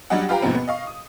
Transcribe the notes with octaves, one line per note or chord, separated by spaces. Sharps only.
F#3 G3 D4 G4 D#5 F#5
F4 G4 B4 F5 G5 A#5
D#2 G#2 B2 F3 B3 C4
B3
D#5 F5 C#6
D#6